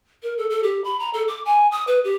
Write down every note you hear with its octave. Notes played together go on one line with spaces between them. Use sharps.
A#4
A4
A4
G4
B5
A#5
A4
D6
G#5
D#6
B4
G4